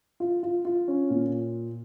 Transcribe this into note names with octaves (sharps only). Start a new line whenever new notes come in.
F4
F4
F4
C#4
A#2